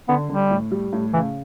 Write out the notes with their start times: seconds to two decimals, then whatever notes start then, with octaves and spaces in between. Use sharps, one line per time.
0.09 D3 B3
0.29 D3 G3
0.51 A2
0.71 G3
0.93 A2
1.14 C#3 E3